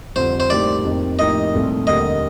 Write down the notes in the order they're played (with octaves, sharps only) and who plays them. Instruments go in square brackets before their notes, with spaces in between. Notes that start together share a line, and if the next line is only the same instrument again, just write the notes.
[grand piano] F2 D3 G3 D4 F4 [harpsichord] C5
[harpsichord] C5
[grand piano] A2 G3 A#3 D#4 G4 [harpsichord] D5
[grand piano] F2 D#3 A#3
[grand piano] A2 F3 A#3 D#4 G4 [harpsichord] D#5
[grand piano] C2 A#2 A3 C4
[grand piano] D#2 D3 G3 A#3 [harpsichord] D#5